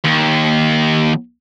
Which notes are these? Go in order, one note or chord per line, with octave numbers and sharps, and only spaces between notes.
D#2